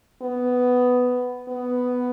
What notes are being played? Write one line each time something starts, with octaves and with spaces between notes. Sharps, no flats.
B3
B3